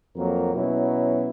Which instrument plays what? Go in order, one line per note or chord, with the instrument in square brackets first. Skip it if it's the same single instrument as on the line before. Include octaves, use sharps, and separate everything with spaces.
[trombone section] F2 F#3 A#3 A#4
B2 F#3 C#4 E4